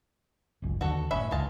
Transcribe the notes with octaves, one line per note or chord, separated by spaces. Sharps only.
G1 C#2 F#2
D#2 D3 F#4 A4
F#1 A2 C#4 E5 B5
C#2 G#3 F5 A5